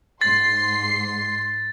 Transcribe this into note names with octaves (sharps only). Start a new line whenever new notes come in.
G#2 C6 A6 C7